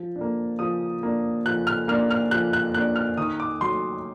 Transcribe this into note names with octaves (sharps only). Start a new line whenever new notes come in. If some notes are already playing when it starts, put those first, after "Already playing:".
Already playing: F3
D4
A#3
F3 D#6
A#3 D4
F3 F#6
F6
A#3 D4 F6
F6
F3 F#6
F#6
A#3 D4 F#6
F6
D#3 D#6
D6
F#3 A3 C6